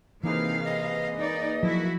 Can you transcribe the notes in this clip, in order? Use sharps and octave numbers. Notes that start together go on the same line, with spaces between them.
C3 E3 A#3 D#4 G#4 B4 F5
D#5
D#4 D5
F3 F#3 E4 F#4